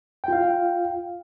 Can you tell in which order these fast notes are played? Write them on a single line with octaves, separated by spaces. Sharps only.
G5 F4 F5